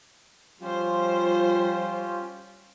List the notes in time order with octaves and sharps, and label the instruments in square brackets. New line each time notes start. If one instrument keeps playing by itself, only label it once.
[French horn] F3 [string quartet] G3 C5 [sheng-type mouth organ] C#4 F4 G4